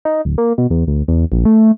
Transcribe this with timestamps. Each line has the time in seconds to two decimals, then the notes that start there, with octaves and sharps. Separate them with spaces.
0.05 D#4
0.25 D1
0.38 A#3
0.58 B2
0.70 E2
0.87 D2
1.08 E2
1.32 A#1
1.45 A3